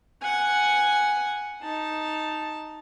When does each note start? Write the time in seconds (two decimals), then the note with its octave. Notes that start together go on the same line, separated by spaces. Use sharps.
0.22 F#5 G#5
1.62 D#4 A5